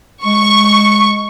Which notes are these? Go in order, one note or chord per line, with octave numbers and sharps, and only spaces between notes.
G#3 C#6